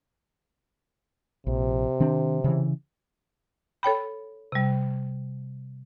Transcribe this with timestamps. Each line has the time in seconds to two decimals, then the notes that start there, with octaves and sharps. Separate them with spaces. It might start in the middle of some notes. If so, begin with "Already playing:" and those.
1.47 A#1 C3
2.00 D#3 C4 D4
2.44 C#3 E3
3.83 A4 C#5 G5 B5
4.52 C3 G3